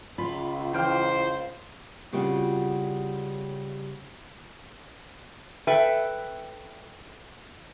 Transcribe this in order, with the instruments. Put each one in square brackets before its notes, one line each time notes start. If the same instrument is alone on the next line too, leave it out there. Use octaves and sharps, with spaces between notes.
[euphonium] C#2 [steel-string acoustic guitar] F4 [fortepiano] B5
[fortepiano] E3 G5 F6 [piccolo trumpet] C5
[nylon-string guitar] C#3 G3 C4 F4 F#4
[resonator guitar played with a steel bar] A4 B4 E5 G5